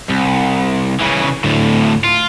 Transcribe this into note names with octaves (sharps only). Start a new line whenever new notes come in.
C2
C#3 E3
D2 A2
F4